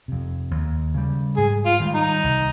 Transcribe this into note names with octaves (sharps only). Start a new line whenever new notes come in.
F2 C3
D#2
C#3 G3
G#2 G#4
F4
D#3 G3
D#4
C2